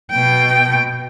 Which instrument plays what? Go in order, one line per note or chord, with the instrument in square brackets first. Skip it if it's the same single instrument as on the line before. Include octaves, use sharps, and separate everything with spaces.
[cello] B2 G5